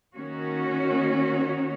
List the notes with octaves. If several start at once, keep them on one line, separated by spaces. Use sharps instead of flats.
D#3 A#3 C#4 F#4 C#5